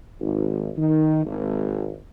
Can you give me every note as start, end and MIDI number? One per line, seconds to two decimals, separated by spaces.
0.20 0.71 32
0.76 1.23 51
1.25 1.95 32